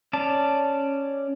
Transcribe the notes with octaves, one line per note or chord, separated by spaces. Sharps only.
C#4 D5 A5